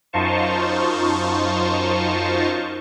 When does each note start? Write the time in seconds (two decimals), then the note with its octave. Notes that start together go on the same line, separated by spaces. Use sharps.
0.13 F#2 D#4 F4 C5 A5 C#6